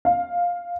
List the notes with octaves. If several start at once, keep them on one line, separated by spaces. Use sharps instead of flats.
F5